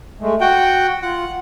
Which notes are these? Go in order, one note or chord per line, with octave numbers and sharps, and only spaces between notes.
G#3 A3
F#4 F#5 G5
F4 F#5